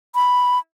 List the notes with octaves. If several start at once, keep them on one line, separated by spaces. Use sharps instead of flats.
B5